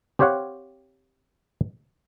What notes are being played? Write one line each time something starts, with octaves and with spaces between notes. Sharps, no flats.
C4 G4 C5 C#5 F5 F#5